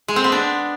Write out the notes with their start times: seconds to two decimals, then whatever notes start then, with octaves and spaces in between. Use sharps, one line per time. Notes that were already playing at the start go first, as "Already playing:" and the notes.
0.08 G#3
0.16 C4
0.24 B3
0.32 D4